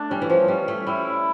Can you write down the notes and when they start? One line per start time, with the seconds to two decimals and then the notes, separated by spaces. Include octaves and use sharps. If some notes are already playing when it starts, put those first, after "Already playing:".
Already playing: A3 D4
0.11 G3 C#4
0.22 E3
0.30 F3
0.48 G3 C#4
0.68 A3
0.86 G3 E4